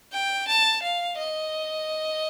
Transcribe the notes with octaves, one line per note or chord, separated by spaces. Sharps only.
G5
A5
F5
D#5